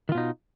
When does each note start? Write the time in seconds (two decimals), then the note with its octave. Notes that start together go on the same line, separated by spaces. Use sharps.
0.09 D#3
0.12 F4
0.15 B2
0.18 D#4